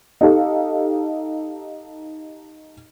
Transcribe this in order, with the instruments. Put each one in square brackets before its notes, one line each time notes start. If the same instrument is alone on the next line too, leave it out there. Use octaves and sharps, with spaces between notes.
[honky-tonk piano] D#4 G4 A4 F5